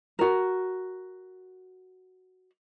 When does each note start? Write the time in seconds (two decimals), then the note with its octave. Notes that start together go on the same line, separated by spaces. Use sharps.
0.19 F#4 A#4